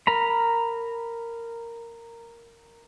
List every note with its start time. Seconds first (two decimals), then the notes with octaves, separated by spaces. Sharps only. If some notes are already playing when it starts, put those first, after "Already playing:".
0.07 A#4 A#5 B5